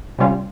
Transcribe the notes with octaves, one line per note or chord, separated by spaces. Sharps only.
C3 G3 C#4 F4